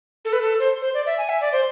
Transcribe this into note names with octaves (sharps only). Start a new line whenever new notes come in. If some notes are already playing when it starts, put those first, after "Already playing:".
A4
B4
A4
C5
C5
D5
E5
G#5
E5
D5
C5